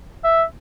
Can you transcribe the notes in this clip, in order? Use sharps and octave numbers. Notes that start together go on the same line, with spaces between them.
E5